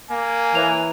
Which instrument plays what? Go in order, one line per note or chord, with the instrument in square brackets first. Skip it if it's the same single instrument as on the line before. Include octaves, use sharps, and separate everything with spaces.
[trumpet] A#3 [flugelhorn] G#5
[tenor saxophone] E3 [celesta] C#5 A#5 F7